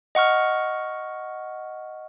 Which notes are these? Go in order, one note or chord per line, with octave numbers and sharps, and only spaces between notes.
D#5 F#5 C#6 F6